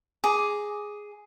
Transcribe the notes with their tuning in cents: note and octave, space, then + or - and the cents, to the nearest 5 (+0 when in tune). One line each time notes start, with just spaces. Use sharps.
G#4 +0 A#5 +0 D6 +0